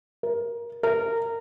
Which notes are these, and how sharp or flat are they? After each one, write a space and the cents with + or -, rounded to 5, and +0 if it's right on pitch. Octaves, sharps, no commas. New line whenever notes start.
A#4 +15
A#4 -20